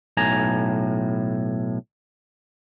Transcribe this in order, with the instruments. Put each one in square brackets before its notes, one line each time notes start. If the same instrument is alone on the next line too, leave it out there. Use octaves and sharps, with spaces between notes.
[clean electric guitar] B1 A2 G#5 A#5